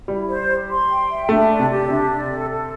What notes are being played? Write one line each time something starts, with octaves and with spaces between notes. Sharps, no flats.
G3 E4
C5
G4
C6
G5
E5
A3 D4
D5
C3
G4
C3 D4
D5
A4
A4